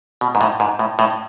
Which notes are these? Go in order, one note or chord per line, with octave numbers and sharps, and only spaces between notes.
B2
G#2
A2
G#2
A2
A2